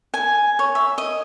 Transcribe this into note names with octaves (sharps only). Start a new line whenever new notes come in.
G#5
C#5
E5
D#5